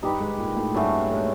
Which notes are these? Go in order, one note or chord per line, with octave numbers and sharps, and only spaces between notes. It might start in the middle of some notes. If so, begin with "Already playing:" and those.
G2 G3 D#4 G4 B4
G#2 G#3
A#2 A#3
A2 A3
G2 F#3 G3 A3 C#4 F#4
G#3